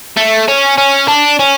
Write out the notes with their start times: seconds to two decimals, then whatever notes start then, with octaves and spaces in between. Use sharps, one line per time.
0.17 A3
0.48 C#4
0.78 C#4
1.08 D4
1.39 C#4